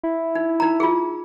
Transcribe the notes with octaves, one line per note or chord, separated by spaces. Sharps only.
E4
D#4
D#4 A#5
F4 G#4